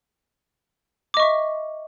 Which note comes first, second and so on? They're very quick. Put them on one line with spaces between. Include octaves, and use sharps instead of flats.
D6 D#5 C#6 E5